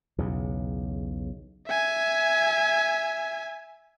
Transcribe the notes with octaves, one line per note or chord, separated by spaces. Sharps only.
B1 E2 C#3
E5 G#5